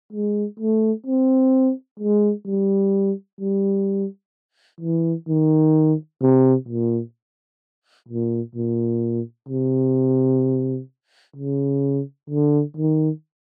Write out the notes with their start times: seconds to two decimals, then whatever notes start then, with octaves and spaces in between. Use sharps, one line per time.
0.13 G#3
0.59 A3
1.06 C4
2.00 G#3
2.46 G3
3.40 G3
4.81 E3
5.28 D#3
6.22 C3
6.68 A#2
8.08 A#2
8.55 A#2
9.49 C3
11.36 C#3
12.30 D3
12.77 D#3